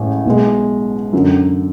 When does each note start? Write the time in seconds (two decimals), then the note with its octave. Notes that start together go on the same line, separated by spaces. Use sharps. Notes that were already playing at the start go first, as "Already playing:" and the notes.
Already playing: A1 A2 E3 G#3 C#4
0.25 B1 B2 G#3
1.13 F#2 D3 F#3